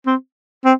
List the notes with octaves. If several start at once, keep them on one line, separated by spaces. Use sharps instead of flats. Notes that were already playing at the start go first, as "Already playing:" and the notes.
C4
C4